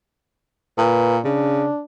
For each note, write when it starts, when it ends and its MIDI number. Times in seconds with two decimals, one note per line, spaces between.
0.78 1.19 46
0.78 1.16 71
1.25 1.67 49
1.25 1.83 62